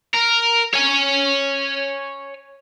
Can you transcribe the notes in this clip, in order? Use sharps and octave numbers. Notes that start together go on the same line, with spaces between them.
A#4
C#5 G#5